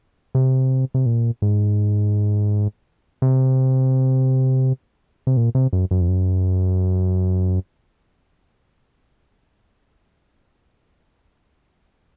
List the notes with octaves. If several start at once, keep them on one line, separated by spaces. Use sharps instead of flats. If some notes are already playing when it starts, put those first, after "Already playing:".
C3
C3
A#2
G#2
C3
C3
A#2
C3
F#2
F#2
F2
F#2